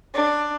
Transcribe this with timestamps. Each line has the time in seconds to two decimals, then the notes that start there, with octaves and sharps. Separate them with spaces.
0.14 D4